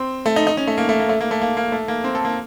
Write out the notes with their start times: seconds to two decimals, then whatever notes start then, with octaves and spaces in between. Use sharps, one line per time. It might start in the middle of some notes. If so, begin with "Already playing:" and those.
Already playing: C4
0.26 A3
0.36 D#4
0.47 D#4
0.57 C#4
0.67 A3
0.78 A#3
0.89 A3
1.00 A#3
1.09 A3
1.21 A#3
1.31 A3
1.42 A#3
1.57 A#3
1.72 A3
1.88 A#3
2.04 C4
2.15 A4
2.25 A#3